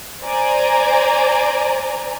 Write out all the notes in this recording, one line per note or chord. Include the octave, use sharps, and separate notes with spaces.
C5 D5 G#5 A#5